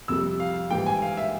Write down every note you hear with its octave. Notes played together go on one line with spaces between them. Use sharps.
F2 C3 G3 E6
F5
G#2 E3 G3 G5
G#5
F5
E5